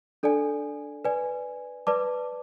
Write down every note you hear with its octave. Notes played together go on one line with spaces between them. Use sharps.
D4 A4 D5 G#5
B4 D5 G#5
B4 D5 A5 D6